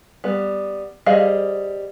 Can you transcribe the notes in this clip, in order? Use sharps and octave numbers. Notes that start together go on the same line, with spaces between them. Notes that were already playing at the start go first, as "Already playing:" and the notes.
G3 B3
G3 G#4 C5 D#5 F5